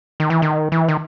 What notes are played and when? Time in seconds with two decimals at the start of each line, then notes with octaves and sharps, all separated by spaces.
0.20 D#3
0.30 E3
0.42 D#3
0.72 E3
0.88 D#3